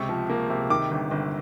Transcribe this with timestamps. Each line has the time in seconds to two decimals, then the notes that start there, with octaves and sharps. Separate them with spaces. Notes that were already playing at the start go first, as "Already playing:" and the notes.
Already playing: C#2 C3 C#6
0.09 F3
0.30 A#3
0.50 C3
0.70 D#3 D6
0.91 G1
1.11 G1